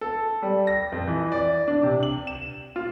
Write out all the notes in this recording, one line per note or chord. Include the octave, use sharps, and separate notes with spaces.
A4
G3
A#6
F2
E3
D5
D4
C3
F#7
E7
F4